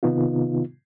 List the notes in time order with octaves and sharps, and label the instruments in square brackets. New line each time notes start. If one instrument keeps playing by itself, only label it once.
[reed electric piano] C3 D#3 B3 D#4 F4